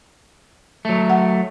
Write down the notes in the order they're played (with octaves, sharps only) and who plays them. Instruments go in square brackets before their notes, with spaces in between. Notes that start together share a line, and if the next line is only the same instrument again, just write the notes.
[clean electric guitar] F#3 A3
[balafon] F#5